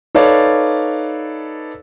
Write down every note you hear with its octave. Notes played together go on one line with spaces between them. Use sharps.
D#4 A4 B4 C#5 D5 F5